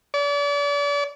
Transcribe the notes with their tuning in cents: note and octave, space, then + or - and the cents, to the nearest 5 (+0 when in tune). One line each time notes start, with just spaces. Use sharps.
D5 -40